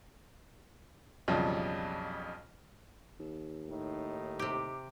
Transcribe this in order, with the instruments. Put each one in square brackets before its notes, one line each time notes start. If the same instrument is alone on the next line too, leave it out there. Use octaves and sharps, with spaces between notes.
[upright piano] B1 F2 C#3 F3 G3
[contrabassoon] D#2
[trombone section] A2 D#4
[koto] C3 G4